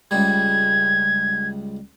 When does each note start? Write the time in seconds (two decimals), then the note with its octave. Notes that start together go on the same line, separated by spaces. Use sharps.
0.11 C#2 G3 G#6